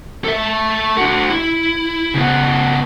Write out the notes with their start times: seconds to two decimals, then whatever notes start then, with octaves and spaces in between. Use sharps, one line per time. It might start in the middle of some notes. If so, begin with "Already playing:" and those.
0.24 A4 E5
0.97 D4 F#4
1.30 E4
2.14 C#3 B3